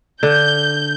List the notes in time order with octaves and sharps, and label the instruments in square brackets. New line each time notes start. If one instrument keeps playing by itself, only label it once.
[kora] D3 [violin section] G6